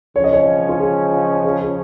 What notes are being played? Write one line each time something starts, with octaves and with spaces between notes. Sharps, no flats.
C#3 F3 C#4 C#5
D#5
C#5
F4
G#4
G#4
G#4